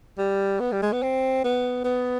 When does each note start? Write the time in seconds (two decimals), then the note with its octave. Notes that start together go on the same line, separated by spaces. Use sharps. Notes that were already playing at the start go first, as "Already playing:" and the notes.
0.18 G3
0.60 B3
0.72 G3
0.82 G#3
0.93 B3
1.03 C4
1.44 B3
1.84 B3